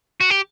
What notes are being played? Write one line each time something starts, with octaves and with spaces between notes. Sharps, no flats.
F#4
G4